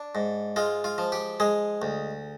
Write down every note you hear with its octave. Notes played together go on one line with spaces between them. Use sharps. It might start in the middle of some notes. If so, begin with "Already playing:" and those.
Already playing: D4
G#2
G#3 F4
F4
F3
G4
G#3 G#4
D2